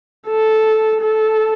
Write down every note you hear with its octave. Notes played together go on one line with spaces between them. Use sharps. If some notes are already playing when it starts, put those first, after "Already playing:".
A4
A4